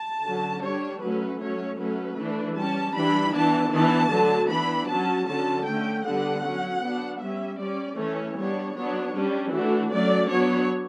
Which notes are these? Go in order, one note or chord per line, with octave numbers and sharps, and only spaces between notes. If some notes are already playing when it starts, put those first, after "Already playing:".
Already playing: A5
D3 F#3 C#4
G3 D4 C#5
F#3 A3 C#4 B4
F#3 A3 C#4 C#5
F#3 A3 C#4 B4
E3 A3 D4
G3 C#4 A5
E3 G3 D4 B5
E3 B3 D4 A5
E3 B3 D4 A5
D3 F#3 A3
E3 B3 D4 B5
F#3 C#4 A5
D3 F#3 C#4 A5
D3 A3 C#4 G5
D3 G3 B3 D4 F#5
F#3 C#4
F#3 B3 D4
G3 C#4 E5
G3 C#4 D5
E3 A3 C#4 C#5
G3 B3 D4 C#5
F#3 B3 D4 C#5
G3 C#4 D4
E3 A3 D4 F#4
F#3 A3 C#4 D5
F#3 B3 D4 C#5